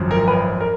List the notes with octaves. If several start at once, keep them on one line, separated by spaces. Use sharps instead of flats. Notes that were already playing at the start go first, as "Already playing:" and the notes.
Already playing: G#1 F#2 F3
A#4
B4
A#4